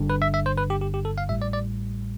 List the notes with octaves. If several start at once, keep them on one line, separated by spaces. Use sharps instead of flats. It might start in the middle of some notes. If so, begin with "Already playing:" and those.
Already playing: G1 G2 D3
B4
E5
E5
C5
B4
G4
G4
G4
A4
F5
A1 A2 G3 E5
D5
D5